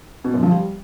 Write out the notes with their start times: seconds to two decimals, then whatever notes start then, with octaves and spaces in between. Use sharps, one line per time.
0.24 B2
0.34 F#2
0.43 F3
0.52 G3